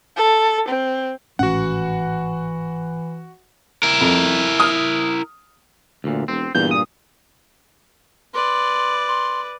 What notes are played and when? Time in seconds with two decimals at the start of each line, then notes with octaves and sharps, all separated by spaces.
0.17 A4
0.68 C4
1.39 G#1 A2 E3 C#4 F#4 F#5
3.83 E4 A#4
4.01 F2
4.60 D#6 F6
6.04 D2 A#2
6.28 E1 C4
6.55 E2 G2 A#2 G6
6.71 D#6
8.34 B4 D5 C6
9.08 C6